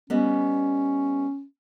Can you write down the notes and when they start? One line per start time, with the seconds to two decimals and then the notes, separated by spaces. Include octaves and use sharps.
0.10 G3 B3 C#4 D#5